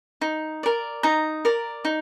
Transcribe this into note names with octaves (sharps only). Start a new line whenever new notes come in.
D#4
A#4 D5
D#4 A#5
A#4 D5
D#4